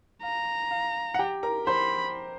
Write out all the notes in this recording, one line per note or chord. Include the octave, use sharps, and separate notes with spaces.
F5 A#5
F5
F#5
G4 G5
A#4 A#5
C5 B5 C6